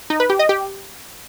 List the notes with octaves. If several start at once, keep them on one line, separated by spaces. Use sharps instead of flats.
D#4
B4
G4
D#5
G4